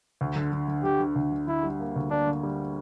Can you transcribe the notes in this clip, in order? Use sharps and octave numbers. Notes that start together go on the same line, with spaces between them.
D2
D3
D3
D3
D3 G4
D3
D2
D3
D3 E4
G3
A#3
D2
A#3 D4
D3
G3